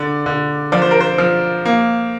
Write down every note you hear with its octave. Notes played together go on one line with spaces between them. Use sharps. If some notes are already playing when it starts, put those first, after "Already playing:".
Already playing: D3 D5
D3
F3 D5
C5
A#4
C5
F3
A#3